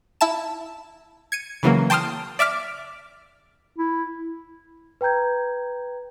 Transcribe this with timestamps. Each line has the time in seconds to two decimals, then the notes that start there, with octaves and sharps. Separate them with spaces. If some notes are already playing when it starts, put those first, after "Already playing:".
0.21 E4 E5 A5 E7
1.32 G#6 C#7 D#7
1.63 C#3 E3 F#3 A#3
1.90 G5 A5 C6 D#6 F6
2.39 D5 E5 D6 F6 B6
3.78 E4
5.01 B4 G5 A#5 G6 G#6